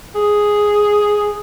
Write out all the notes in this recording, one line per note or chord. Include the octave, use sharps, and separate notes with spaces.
G#4